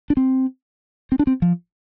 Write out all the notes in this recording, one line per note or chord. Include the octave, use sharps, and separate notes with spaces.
D4
C4
C4
D4
C4
F3